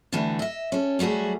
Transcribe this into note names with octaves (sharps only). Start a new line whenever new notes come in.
D3 E3 G3 A3 F#4
D#5 E5
C#4 A4
F#3 G3 A3 F#4 G#4